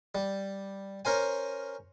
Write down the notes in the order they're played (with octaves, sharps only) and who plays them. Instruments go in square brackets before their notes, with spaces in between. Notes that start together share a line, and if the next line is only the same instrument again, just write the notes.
[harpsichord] G3
C#4 A#4 C5 G#5